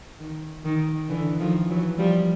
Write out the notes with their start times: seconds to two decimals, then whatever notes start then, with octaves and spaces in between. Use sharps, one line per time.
0.20 D#3
0.65 D#3
1.09 D3 E3
1.39 D#3 F3
1.69 E3 F#3
1.99 F3 G3